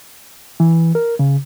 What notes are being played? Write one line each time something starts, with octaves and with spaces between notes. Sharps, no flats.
E3
A#4
C#3